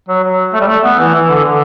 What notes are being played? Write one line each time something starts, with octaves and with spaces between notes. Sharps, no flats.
F#3
F#3
A3
G3
A3
B3
E3
E3
D3
D3